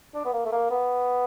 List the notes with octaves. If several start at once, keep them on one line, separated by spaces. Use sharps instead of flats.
D4
B3
A#3
A3
A#3
B3